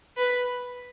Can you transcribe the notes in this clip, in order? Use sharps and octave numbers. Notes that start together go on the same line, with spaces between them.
B4